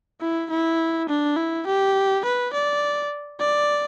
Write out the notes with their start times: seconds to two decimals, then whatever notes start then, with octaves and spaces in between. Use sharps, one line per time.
0.21 E4
0.50 E4
1.09 D4
1.37 E4
1.67 G4
2.25 B4
2.53 D5
3.40 D5